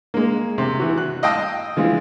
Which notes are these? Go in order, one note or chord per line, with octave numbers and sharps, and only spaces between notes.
G#3 A#3
C3
E3 F#4
F#6
D#5 F5 G5 A5 D#6 E6
E3 F3 G#3 F4